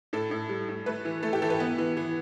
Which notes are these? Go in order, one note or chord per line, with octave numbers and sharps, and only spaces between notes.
A2 A4
A2
G3
A2
A3 B4
E3
A3 A4
G4
E3 A4
B4
B3
E3
E3